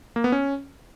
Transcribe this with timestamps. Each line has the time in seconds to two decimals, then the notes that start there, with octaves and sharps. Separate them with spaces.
0.16 A#3
0.24 B3
0.32 C#4